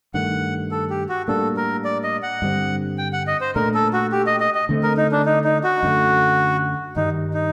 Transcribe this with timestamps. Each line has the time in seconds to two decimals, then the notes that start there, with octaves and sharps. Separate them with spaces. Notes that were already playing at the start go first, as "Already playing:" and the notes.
0.14 G2 D#3 A3 F#5
0.71 A4
0.90 G4
1.09 F#4
1.28 A2 G3 A#3 D4 A4
1.57 A#4
1.85 D5
2.04 D#5
2.23 F#5
2.42 G2 D3 G3 C4
2.98 G5
3.13 F#5
3.27 D#5
3.41 C5
3.55 A#2 A3 D4 A#4
3.74 A4
3.93 F#4
4.12 G4
4.27 D#5
4.40 D#5
4.55 D#5
4.69 D3 A3 C4
4.83 A#4
4.97 D#4
5.12 D4
5.26 D#4
5.44 D#4
5.64 F#4
5.83 F#2 D3 F#3 A3
6.96 G2 D#3 G3 D#4
7.34 D#4